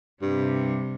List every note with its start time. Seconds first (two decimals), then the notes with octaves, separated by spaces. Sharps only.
0.22 G2 C3 G3